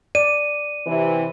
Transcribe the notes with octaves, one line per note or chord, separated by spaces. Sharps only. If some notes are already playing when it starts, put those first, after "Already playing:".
D5 D#7
C3 E3